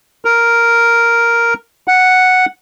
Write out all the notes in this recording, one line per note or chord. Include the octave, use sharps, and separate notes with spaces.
A#4
F#5